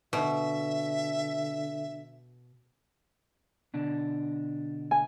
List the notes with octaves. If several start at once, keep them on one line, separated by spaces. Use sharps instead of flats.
B2 D3 E5
B2 D3 D4
G#5